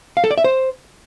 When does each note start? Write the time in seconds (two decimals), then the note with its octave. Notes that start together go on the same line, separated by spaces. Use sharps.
0.17 F5
0.24 A4
0.31 D5
0.38 E5
0.44 C5